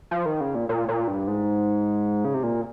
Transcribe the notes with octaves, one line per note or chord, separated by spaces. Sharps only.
F3
D#3
C#3
A#2
A#2
A#2
G2
G#2
C#3
C3
A#2